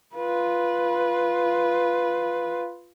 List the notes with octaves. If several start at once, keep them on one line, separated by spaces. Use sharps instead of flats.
F4 B4